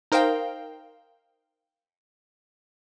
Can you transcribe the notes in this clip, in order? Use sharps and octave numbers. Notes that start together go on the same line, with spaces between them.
D#4 A#4 C5 F5 G5